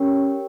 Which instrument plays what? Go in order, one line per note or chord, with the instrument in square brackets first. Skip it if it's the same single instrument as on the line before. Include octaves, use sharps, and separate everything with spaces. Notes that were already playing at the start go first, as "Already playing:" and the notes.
Already playing: [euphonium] C#4 [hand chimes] G4 A#4 C#5 G5